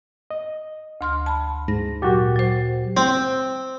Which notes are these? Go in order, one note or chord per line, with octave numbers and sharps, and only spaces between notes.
D#5
D2 C6 F6
A5 B5
G#2 A#6
A#2 F#3 F#4 G4
F#3 C5
C4